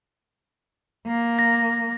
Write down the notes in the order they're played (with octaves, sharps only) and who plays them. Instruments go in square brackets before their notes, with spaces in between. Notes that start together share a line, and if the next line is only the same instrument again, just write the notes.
[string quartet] A#3
[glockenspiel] A#6